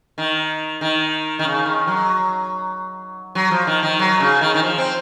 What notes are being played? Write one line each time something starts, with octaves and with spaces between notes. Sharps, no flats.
D#3
D#3
D#3
C#3
D#3
F#3
F#3
F3
D#3
D#3
F#3
C#3
D#3
D#3
F3
C4